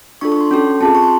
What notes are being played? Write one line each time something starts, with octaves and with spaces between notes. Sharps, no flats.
D4 F4 A4 C#6
C#6
C6
C#4 F#4 A4
C4 F4 G#4 A5
C#6
C6